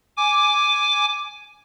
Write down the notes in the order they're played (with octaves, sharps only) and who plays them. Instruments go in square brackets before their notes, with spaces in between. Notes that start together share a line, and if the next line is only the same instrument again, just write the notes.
[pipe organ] G#5 D6